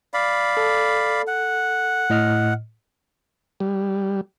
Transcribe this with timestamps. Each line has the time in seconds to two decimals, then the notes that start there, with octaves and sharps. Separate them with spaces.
0.14 D5 F5 B5
0.57 A4
1.27 F#5
2.10 A2 D#5 F6
3.60 G3